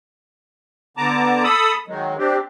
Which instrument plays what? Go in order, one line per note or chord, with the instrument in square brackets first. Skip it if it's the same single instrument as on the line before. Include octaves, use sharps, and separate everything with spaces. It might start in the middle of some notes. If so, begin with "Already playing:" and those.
[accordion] D3 B3 A5 A#5 D6
A4 B5 D#6 E6
D#3 F#3 G#3
C4 D4 G4